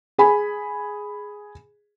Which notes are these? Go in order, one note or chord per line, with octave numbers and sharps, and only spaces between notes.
G#4 G#5 B5